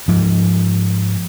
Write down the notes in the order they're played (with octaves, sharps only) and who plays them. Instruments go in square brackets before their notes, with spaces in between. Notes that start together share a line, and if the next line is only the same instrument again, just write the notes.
[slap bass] G#2 F3